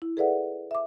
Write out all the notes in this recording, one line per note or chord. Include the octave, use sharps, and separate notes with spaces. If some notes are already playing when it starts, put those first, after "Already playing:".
E4
G#4 A4 B4 D5 E5 F#5
E5 D6